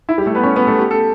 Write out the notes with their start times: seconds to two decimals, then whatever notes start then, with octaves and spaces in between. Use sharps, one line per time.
0.09 E4
0.18 G3 G4
0.26 A3 A4
0.35 B3 B4
0.44 C#4 C#5
0.56 B3 B4
0.67 A3 A4
0.79 G4
0.91 A4